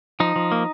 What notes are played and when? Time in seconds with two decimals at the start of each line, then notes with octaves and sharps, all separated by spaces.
0.20 F3 D#4
0.36 F3
0.52 A#3